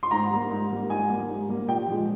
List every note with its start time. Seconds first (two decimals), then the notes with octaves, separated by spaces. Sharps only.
0.03 C6
0.11 G#2 A#5
0.31 G3 A#3
0.51 G#2
0.70 G3 A#3
0.89 G#2 G#5
1.09 G3 A#3
1.28 G#2
1.49 G3 A#3
1.68 A#2 G5
1.87 F3 G#3